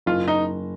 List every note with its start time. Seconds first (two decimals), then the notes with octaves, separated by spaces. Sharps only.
0.06 F#1 F4
0.28 D#4